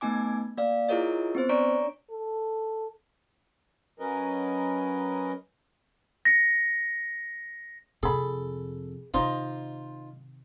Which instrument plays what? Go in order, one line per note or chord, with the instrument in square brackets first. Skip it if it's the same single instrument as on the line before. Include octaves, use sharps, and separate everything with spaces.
[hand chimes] A3 B3 D#4 G#5 D6
A#3 D5 F5
E4 F4 G#4 A#4 C#5 D#5
B3 C4 C5
D4 C#5 D5 A#5 C#6 D7
[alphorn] A4
[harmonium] F#3 C#4 A#4 B4 D#5
[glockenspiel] A#6 C#7
[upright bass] F2 C3 [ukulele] G#4 B5 [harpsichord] A4
[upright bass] C3 D#3 [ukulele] D#4 D#5 [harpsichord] F4 C5